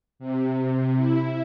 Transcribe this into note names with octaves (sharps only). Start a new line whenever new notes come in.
C3
E4